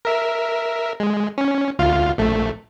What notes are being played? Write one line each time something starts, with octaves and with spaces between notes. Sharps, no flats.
A#4 E5
G#3
C#4
D2 F4 F5
A#1 A3